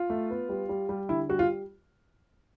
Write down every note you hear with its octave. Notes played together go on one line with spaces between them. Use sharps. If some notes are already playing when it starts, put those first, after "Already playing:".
Already playing: F4
A3
B3
G3
G3
G3
D3 E4
G3 F#4
F4